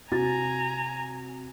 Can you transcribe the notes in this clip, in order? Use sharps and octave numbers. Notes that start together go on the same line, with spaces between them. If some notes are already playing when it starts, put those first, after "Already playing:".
C3 F#4 G#5 A#5 A6